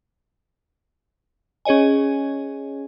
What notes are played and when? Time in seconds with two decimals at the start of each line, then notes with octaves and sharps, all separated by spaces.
1.65 C#4 G#4 C#5 D#5 G#5